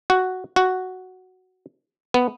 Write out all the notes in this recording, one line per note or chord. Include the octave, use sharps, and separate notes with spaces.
F#4
F#4
B3